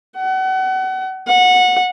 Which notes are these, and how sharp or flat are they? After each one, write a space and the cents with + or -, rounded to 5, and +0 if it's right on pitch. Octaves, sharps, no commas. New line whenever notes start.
F#5 +35
F#5 -20